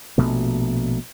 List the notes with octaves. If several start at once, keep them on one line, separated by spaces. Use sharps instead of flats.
A#1 B2 A3